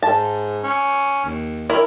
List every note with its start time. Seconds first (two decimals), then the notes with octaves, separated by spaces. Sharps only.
0.02 G#2 A5
0.64 C#4
1.25 D#2
1.70 E4 A#4